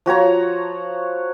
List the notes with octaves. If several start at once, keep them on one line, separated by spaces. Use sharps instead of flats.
F3 F#4 C#5 A#5